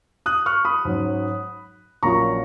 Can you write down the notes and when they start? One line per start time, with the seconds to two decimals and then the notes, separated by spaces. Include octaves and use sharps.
0.26 D#6 F#6
0.46 C#6 F6
0.65 B5 D#6
0.85 G#2 F#3 C#4
2.03 A#1 A#2 F#3 C#4 A#5 C#6